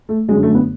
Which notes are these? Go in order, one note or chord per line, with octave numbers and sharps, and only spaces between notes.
A3
F#2 D3 G#3
A3
B3